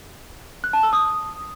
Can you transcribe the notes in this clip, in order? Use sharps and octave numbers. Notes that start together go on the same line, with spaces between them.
F#6
A5
E6
D#6